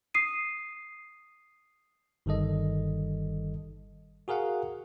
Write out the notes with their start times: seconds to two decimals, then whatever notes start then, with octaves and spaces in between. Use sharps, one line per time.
0.14 D#6 C7 D#7
2.26 G1 D#3 G3 A4 D#5
4.28 F#4 G#4 A#4 F5 F#5